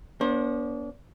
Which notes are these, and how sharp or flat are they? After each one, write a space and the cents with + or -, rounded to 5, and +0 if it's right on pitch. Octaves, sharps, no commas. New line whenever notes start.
B3 -40 D4 -35 C5 +30